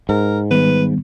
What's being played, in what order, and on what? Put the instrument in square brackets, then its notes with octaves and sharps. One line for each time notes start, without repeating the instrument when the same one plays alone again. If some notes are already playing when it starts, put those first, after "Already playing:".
[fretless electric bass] G#2 [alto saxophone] A#4
[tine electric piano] D#3 G3 B3 [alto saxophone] B4